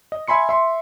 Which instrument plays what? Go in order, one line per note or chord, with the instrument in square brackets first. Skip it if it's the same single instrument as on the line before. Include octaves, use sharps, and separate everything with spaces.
[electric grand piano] D#5
E5 G#5 B5 C6 C#7
E5 C6